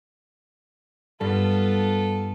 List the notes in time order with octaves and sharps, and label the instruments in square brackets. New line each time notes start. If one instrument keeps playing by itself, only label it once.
[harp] G2 [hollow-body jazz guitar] G3 [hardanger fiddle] B3 F4 [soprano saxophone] A4